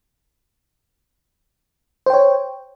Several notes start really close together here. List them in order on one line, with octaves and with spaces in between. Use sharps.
C5 G5 C#5